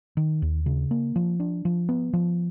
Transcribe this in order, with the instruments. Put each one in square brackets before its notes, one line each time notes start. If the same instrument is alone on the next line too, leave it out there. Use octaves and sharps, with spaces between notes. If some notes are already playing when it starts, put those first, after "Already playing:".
[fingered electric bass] D#3
D#2
C#3
A#3
F3
D4
F3
B3
F3